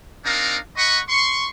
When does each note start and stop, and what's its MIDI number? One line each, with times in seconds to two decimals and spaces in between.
0.25 0.57 60
0.25 0.57 62
0.25 0.57 63
0.25 0.57 70
0.25 0.57 77
0.77 0.99 75
0.77 0.99 78
0.77 0.99 83
0.77 0.99 85
1.08 1.47 84
1.08 1.47 85